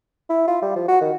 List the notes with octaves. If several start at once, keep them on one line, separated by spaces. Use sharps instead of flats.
E4
F4
G3
F3
F#4
D#3